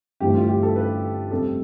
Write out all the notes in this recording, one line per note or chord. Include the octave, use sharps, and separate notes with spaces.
G1 G2 E3 A3 C4 G4
F4
G4
A4
B4
F1 F2 C3 G3 A4